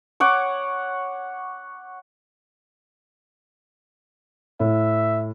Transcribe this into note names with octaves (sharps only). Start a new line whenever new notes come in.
C#5 F#5 D6
A2 E5